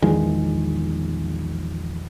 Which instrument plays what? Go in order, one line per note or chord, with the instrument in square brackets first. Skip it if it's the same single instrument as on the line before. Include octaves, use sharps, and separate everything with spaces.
[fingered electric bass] A#1 E2 D#3 G#3